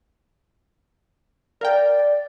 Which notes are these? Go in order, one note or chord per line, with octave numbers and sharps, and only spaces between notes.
A#4 D5 F5 G5